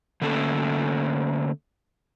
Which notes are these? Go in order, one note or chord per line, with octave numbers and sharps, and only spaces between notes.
D3 A3 A#3 C#4 A4